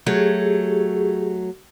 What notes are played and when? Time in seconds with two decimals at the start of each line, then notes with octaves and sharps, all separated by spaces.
0.07 F#3 A3 G4 G#4